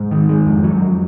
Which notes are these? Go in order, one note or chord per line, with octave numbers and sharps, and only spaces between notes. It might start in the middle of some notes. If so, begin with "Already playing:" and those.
Already playing: G#2
D#3
G#3
F2
F#3
F2